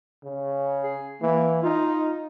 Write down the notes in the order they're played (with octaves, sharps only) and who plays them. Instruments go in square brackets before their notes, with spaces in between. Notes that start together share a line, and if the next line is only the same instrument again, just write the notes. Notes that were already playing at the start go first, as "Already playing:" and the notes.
[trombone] C#3
[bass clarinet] G#4
[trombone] E3 [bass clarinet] A#3
[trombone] D#4 [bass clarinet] F4